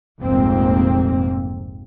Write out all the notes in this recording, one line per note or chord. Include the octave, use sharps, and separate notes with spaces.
F1 A#1 F2 G#2 A#3 C4